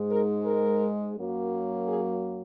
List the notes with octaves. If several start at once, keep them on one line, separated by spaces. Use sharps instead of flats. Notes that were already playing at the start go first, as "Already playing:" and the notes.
Already playing: G#2 G#3
A#4
A#4
F#2 F#3 A#3
G#4